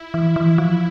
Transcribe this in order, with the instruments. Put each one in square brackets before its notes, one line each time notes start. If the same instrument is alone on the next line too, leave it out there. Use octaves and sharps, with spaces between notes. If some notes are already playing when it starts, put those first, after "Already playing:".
Already playing: [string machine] E4
[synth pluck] E3
E3
F3